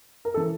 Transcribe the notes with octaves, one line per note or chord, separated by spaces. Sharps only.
A#4
A4
E3